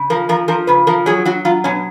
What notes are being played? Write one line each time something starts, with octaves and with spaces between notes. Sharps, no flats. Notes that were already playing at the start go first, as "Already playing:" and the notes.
Already playing: C#3
F3 A#4
F3 A#4
F3 A#4
C#3 B4
F3 A#4
F#3 G#4
F#3 F#4
F#3 F4
B2 C#4